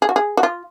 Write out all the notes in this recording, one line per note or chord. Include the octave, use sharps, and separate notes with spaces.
G#4
F#4
G#4
F#4
F4